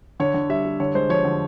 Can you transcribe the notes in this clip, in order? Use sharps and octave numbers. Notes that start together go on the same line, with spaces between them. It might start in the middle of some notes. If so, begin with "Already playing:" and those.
D3 C#5
D3
G3 E5
G3
D3 C#5
G#3 C5
F3 C#5
D3